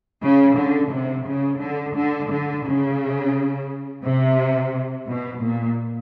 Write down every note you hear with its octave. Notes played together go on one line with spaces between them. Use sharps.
C#3
D3
C3
C#3
D3
D3
D3
C#3
C3
B2
A#2